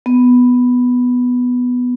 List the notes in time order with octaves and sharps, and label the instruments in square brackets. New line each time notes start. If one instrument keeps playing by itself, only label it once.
[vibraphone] B3